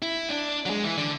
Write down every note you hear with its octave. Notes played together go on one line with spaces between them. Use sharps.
E4
D4
F#3
G#3
E3
D3